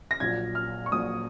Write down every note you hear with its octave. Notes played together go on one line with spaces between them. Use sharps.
A#6
A#1 A#2 F#3 G#6
F6
C#6
A#1 A#2 F#3 D#6